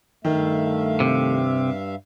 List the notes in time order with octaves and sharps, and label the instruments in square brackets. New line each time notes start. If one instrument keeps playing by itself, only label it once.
[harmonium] G2 E5 F5 [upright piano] D#3 [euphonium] A3
[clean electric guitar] C3